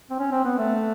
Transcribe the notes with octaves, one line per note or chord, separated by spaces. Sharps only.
C4
C#4
C4
B3
A3